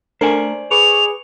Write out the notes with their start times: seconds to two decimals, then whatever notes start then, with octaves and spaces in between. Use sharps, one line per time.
0.21 A3 D4 A#4 C5 D5 G#5
0.71 G#4 B4 C#6 D6 F7